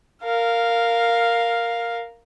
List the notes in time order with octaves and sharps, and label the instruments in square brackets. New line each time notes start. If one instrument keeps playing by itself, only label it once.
[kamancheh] A#4 F5